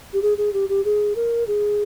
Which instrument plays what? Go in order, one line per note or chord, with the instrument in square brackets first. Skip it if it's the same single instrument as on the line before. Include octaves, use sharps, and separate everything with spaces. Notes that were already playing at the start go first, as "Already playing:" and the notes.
[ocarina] G4
G#4
G#4
G4
G4
G#4
A#4
G#4